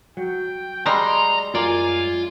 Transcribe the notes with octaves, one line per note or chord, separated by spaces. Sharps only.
F#3 G5
G3 G#3 A#5 C6
F#2 F4 A#4 D5 G#5